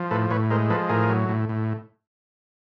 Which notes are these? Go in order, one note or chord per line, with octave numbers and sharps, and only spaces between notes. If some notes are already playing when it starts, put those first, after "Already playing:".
Already playing: F3
A2 A4 B4
A2 B4 C#5
G#3 A#4 C5
F3 A4 B4
A2 G#4 A#4
F#3
A2
A2